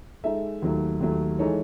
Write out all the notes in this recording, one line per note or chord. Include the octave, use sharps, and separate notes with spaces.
G#3 D#4 A4 E5
D#2 D#3 F#3 A3
D#2 D#3 F#3 A3
E3 G#3 D#4 A4 C#5